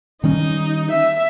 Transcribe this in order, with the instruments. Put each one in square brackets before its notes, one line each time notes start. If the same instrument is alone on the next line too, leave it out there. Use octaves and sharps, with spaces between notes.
[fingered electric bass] D#3 G3 C#4 [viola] D#4
[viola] E5